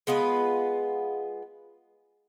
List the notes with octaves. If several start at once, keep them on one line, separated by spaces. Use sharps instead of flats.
G#3 B3 F4 B4